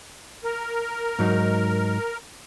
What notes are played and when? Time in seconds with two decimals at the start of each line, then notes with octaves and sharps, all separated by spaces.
0.44 A#4
1.19 G#2 F#3 D#4